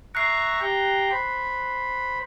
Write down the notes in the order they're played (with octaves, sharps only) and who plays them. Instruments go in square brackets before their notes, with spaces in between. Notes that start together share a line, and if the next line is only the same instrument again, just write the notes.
[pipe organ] E5 A#5 C#6 [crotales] F#6 C7
[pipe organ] G4 G5 A#5
C5 B5